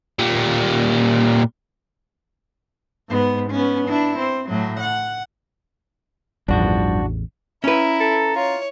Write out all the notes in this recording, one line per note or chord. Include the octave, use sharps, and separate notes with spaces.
A#2 G3
G#2 B3
B3 C#4
D4 E4
C4
A2 F#3
F#5
A1 E2 G2 F3 D4 F#4
C#4 E4 B4 A#5
A4
F4 C#5